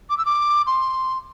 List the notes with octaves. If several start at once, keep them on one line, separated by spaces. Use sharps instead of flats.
D6
E6
D6
C6